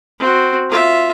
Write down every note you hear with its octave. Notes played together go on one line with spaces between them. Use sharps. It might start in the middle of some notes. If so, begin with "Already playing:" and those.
C4 F#4
F4 E5